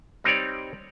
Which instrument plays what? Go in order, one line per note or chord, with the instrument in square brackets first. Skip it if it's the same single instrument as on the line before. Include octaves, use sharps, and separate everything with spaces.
[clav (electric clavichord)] G3 C4 D#4 G4 C#5 D5